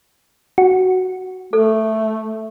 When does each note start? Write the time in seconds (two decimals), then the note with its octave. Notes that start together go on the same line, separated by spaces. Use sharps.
0.58 F#4
1.53 A3 A4